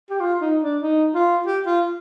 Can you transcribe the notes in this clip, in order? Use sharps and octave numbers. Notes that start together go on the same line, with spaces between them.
G4
F4
D#4
D4
D#4
F4
G4
F4